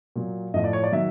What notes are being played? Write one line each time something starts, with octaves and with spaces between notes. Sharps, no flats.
A#2 F#3
A2 F3 D#5
D5
C#5
D5
D#3 F#3 E5